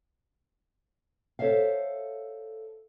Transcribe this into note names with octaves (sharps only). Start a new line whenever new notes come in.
A4 C5 C#5 E5 F5